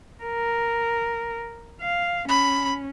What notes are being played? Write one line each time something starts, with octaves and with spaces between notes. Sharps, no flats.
A#4
F5
C#4 B5